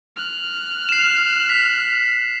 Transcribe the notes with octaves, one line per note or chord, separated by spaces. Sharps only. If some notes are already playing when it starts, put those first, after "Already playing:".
F6 F#6
C7 E7
B6